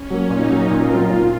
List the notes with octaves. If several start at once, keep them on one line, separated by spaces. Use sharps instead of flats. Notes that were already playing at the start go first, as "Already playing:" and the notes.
Already playing: C#4
F#3 A#3
A#2 D#4
F#3 A#3
A#2 F4
F#3 C4 F4 A#4
A#2